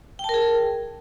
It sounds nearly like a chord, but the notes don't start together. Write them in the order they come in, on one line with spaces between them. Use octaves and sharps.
G5 A5 A#4 G#4